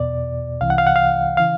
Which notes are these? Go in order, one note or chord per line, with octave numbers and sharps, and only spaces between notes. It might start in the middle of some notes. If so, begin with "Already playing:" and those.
Already playing: E2 B2 D5
C2 C3 E3 F5
F#5
F5
F#5
F5
C#3 E3 F5